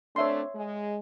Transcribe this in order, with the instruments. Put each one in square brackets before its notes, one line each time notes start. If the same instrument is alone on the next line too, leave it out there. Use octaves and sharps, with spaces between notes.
[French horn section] A3 C4 D4 [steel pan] C#5 E5 C6
[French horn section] G#3